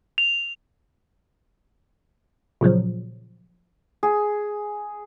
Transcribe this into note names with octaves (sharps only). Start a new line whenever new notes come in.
F7
A#2 C#3 F3 F#3
G#4